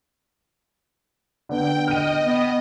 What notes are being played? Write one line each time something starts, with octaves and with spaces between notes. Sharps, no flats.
D3 B3 G5
D#5 F6 D#7
B3